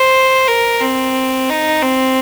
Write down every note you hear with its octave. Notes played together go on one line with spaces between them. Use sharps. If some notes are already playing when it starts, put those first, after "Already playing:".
Already playing: C5
A#4
C4
D#4
C4